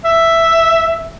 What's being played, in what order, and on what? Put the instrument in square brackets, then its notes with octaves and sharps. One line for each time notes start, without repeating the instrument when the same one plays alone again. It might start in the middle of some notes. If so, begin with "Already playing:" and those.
[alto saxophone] E5